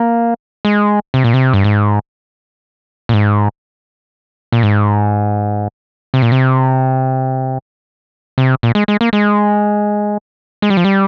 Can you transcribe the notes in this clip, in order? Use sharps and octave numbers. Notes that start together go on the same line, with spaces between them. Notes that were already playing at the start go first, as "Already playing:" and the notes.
Already playing: A#3
G#3
C3
A#2
C3
G2
G#2
A#2
G#2
A#2
G#2
C3
A#2
C3
C3
A#2
G#3
G#3
A#3
G#3
G#3
G3
F3
G3